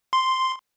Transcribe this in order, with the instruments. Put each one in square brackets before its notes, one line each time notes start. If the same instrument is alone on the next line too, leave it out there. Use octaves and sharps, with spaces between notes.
[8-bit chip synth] C6